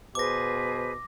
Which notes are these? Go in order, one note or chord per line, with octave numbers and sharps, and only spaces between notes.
B2 G#4 B4 C5 D6 A#6